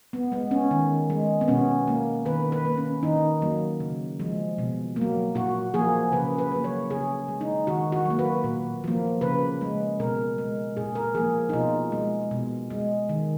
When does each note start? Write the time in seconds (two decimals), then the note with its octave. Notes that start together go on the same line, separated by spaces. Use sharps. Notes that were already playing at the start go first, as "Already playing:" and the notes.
0.13 B3
0.32 G#3 B3
0.51 C#4
0.71 D#3
1.10 G#3
1.41 B3
1.48 B2 C#4
1.87 A#3
2.25 D#3 B4
2.52 B4
2.65 A#3
2.77 C#4
3.03 D#3 D#4
3.42 F#3 A#3
3.80 C#3
4.20 F3 G#3
4.58 B2
4.96 A#3
5.01 F#3
5.35 A#2 F#4
5.74 F3 A#3 G#4
6.12 C#3 B4
6.38 B4
6.51 F#3 A#3
6.64 C#5
6.90 C#3 G#4
7.28 G#3
7.41 D#4
7.67 D#3 F#4
7.92 F#4
8.05 F#3 A#3
8.19 B4
8.44 A#2
8.84 F3 A#3
9.21 C#3 B4
9.61 G#3
10.00 B2 A#4
10.38 G#3
10.77 A#2 G#4
10.95 A#4
11.15 F3 G#4
11.17 A#3
11.49 D#4
11.53 B2 F4
11.92 G#3
12.31 B2
12.70 G#3
13.09 D#3